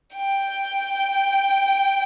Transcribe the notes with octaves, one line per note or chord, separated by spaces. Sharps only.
G5